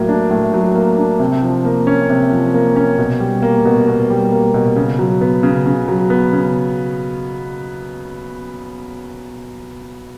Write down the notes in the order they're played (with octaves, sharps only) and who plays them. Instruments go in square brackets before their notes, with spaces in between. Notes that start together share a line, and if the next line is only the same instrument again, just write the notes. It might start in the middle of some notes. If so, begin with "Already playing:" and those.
Already playing: [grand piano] A2 F#3 A#3
D4
A2
F#3
A#3
D4
C3
F3
A#3
C#4
C3
F3
A#3
C#4
B2
G3
A#3
B2
B2
G3
A#3
B2
C#3
F#3
B3
C#3
C#3
F#3
B3
C#3